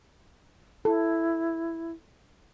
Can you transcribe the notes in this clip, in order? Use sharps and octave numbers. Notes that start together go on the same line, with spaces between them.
E4 A4